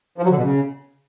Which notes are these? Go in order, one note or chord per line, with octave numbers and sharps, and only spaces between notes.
F3
F#3
D3
B2
C#3